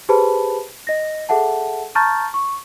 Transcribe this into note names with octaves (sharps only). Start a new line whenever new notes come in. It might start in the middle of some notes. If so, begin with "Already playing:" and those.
G4 G#4 B4 C5 A5 B5
D#5 A#6
G#4 A4 E5 F#5 A5
A5 A#5 C#6 F6 G6 A6
C#6